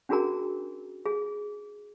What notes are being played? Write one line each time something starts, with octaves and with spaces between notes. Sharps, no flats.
C#4 D4 F#4 G#4 A#4 A#5
G#4